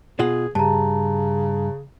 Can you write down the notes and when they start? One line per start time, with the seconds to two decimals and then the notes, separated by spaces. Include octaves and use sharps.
0.19 B2 F4 G#4 F#5
0.55 G2 C#3 A5 A#5